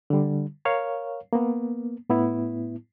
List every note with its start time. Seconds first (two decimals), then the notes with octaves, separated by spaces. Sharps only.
0.10 D3 G3
0.65 A#4 C#5 F5
1.33 A#3 B3
2.09 A2 B3 E4